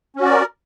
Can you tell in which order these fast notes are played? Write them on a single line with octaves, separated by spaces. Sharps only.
C#4 F#4 D5 A#4